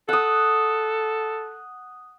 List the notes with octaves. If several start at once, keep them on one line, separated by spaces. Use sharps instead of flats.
A4 F#5 D#6